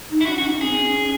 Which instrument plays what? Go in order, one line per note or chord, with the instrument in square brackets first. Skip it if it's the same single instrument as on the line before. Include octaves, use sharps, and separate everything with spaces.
[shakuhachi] D#4
[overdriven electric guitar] E4
[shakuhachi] C#4 [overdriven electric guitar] F#4
[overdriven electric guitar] F#4
[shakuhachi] D#4
C#4
[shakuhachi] C4 [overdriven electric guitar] G#4
[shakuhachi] D#4
C#4